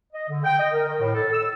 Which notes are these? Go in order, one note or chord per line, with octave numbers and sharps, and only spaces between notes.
D#5
D3
G5
D#5
A#4
D#3
A2
A4
E6